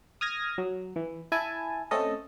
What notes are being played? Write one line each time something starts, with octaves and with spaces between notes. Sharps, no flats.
D#6 F6 G#6 A#6
F#3
E3
E4 G#5 A5
A3 C4 C#4 A4 D#5